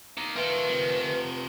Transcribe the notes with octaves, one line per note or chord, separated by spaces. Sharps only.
A#3 D#4
A3 F4 A#4 B4 G5
C3 F3